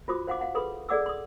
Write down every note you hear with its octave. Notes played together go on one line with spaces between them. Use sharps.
F4 F#4 C5 D6 D#6
C5 F5 F#5 C6 D6
F5 F#5 C6
G#4 A4 B4 B5 C6 D#6
G#4 A4 D5 F#5 D6 E6
C6 D#6